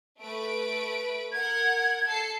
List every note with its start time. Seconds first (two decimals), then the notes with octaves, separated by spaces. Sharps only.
0.21 A3 B4 D7
1.32 A#4 F#5 G#6
2.07 A4 C7 C#7